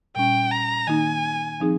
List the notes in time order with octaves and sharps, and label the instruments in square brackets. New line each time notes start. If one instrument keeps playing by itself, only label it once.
[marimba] A#2 G3 C#4 [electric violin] G5
[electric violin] A#5
[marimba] D#3 A#3 D#4 [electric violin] G#5
[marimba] F3 C4 D#4 G#4